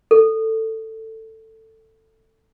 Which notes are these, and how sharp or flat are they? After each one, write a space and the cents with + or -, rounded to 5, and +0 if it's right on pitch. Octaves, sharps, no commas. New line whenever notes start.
A4 +15